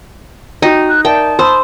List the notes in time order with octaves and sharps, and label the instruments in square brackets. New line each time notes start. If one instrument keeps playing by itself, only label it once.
[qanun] D#4 [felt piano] F#4 G5
[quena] F#6
[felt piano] A#4 D5 E5 [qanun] G5 [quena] A5
[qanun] C5 [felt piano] B5 D#6 E6